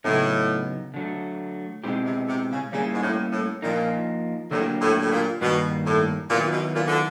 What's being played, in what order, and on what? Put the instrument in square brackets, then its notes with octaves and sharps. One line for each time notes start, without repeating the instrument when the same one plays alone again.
[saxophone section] A2 [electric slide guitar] C#3 F#3 B3 D#4
[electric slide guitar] D3 F#3 A3
[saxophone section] G#2 [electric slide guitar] B2 G#3 C4 E4 G4
[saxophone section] C3
C3
C#3
[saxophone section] C#3 [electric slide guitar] G3 A#3 C#4 E4
[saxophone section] G#2
A2
A2
[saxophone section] A#2 [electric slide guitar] F3 A#3 D#4
[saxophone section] A2 [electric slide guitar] D3 F#3 A#3 D4 G4
[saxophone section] A2
A2
A#2
[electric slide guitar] G2 D#3 G3 A#3 [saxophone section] B2
[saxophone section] A2
[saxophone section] A#2 [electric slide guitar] D#3 F#3 B3 E4
[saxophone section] B2
A#2
D3